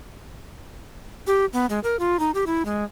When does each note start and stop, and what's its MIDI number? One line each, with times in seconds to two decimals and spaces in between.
1.27 1.45 67
1.53 1.66 59
1.70 1.79 56
1.84 1.96 70
1.99 2.19 65
2.19 2.31 63
2.34 2.44 67
2.46 2.65 64
2.65 2.84 56